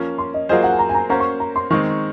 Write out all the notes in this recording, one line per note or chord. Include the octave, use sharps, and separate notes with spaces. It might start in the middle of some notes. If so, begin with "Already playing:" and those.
Already playing: F3 A#3 C#4
C6
D#5
F#3 A#3 F4 G#4 C5 D#5
F#5
G#5
A#5
G#5
A#5
A#3 C#4 F#4 C5 A#5
C#6
A#5
C6
D#3 G#3 C4 D#4 C#6